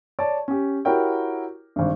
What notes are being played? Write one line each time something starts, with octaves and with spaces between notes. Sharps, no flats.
C#5 D5 A5
C#4 G4
E4 F#4 G4 A#4 C#5 G5
G#1 G2